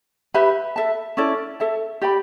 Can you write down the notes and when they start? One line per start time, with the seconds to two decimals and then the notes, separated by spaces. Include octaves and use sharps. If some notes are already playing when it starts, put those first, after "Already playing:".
0.34 G4 B4 E5 B5
0.76 A4 E5 A5
1.17 C#4 E4 A4 D5
1.60 A4 E5 A5
2.02 G4 D5 G5 B5